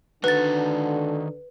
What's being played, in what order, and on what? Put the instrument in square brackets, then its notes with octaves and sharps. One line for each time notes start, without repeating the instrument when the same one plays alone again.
[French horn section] D3 [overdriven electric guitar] D#3 F#4 [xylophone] B4 A6